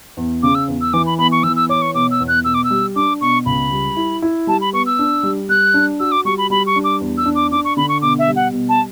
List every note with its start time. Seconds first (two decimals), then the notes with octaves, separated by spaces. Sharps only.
0.17 E2
0.43 C#3 D6
0.55 E6
0.68 E2
0.81 E6
0.93 E3 D6
1.07 B5
1.18 B3 B5
1.32 C#6
1.43 E3 E6
1.56 E6
1.69 C#5 D6
1.82 C#6
1.95 B2 D6
2.11 E6
2.20 E2
2.28 F#6
2.45 B2 E6
2.54 D6
2.64 E6
2.70 G3
2.96 D4 D6
3.21 B2 C#6
3.46 C#2 B5
3.72 G3
3.96 E4
4.22 E4
4.47 G3 A5
4.61 B5
4.73 B3 C#6
4.86 E6
4.99 D4
5.23 G3
5.49 G3 F#6
5.74 D4
6.00 F#4 E6
6.12 D6
6.25 G3 C#6
6.38 B5
6.50 G3 B5
6.67 C#6
6.76 D4
6.84 D6
7.01 E2
7.18 E6
7.26 D4
7.35 D6
7.51 D4 D6
7.65 C#6
7.77 D3 B5
7.89 C#6
8.02 B2 D6
8.19 E5
8.28 G3
8.36 F#5
8.52 B2
8.69 A5